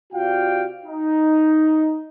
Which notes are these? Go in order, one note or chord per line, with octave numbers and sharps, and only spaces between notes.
C3 F4 F#4 D5 F5 G5
D#4